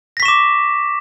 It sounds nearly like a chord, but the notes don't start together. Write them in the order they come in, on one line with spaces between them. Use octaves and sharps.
A#6 B6 C#6 E7 D6